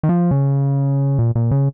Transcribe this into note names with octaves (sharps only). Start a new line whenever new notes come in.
D#3
F3
C#3
A#2
A#2
C#3